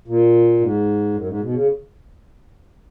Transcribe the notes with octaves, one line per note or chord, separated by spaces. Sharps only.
A#2
G#2
F#2
G#2
B2
C#3